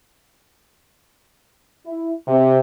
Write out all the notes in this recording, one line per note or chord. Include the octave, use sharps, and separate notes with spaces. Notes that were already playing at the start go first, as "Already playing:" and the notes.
E4
C3